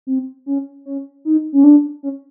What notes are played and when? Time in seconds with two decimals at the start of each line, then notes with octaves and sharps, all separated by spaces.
0.07 C4
0.46 C#4
0.86 C#4
1.25 D#4
1.53 C#4
1.64 D4
2.03 C#4